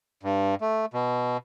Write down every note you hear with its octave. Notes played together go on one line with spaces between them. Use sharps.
G2
A3
B2